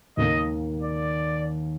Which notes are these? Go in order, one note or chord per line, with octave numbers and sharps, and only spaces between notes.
D#2 D#3 A#3 D#5
D5